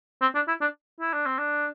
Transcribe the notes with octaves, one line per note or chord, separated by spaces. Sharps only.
C4
D4
E4
D4
E4
D4
C4
D4